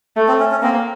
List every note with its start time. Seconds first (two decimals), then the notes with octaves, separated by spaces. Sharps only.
0.16 A3
0.28 C4
0.40 C#4
0.51 C#4
0.63 A#3 C4